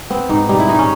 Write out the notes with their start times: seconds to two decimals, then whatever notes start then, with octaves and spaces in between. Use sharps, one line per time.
0.10 B3 C4
0.29 G#2 D#4
0.49 G3 D#4
0.60 E4
0.68 D#3 D#4
0.79 C#4